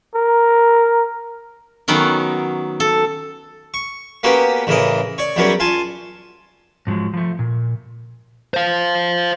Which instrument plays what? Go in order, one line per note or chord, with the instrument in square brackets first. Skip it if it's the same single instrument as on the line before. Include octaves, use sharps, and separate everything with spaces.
[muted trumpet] A#4
[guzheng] D#3 F#3 B3 C#4 A#4
A4
[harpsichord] C#6
A#3 B3 C#4 F#4 G4 A#4
A1 C#3 E3 A#4 D#5
C#5 D5
E2 F#3 G3 C#4 A#4 C#5
F4 G#5 A5
[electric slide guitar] G#2 F3 F#3 G#3
F3 A3
A#2
[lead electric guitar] C5 F5